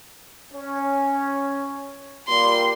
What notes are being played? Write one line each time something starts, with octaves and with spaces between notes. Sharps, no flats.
C#4
A#2 G3 C6